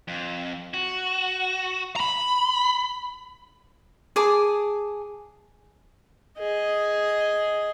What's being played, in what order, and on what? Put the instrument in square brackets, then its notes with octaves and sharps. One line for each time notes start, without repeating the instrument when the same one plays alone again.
[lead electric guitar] F2
F#4
A#5 B5
[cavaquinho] G#4 G#5 A5 D6
[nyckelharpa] G#4 D#5